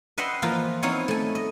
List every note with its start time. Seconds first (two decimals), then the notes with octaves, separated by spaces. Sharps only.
0.18 B4 D#5 E5 F#5 G5 C6
0.42 E3 F3 A#3 F4 B4
0.82 B3 C4 D#4 E4 C#5 F5
1.08 A3 G#5
1.35 D#5